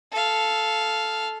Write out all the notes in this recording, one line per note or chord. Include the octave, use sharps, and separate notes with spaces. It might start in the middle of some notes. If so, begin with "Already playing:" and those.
A4 F5